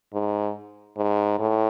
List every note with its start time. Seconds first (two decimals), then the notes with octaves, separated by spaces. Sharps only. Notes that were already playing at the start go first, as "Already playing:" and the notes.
0.13 G#2
0.97 G#2
1.39 A2